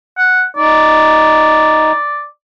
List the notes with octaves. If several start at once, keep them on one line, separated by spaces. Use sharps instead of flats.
F#5
D#4 D5